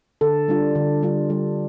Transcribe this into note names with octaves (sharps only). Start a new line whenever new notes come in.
D3 A4
G3 D4 F4
D3
G3 D4 F4
G3